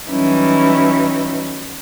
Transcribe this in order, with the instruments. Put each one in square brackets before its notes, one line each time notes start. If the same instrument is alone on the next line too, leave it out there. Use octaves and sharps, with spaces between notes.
[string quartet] E3 F#3 G3 C#4 D#4 E4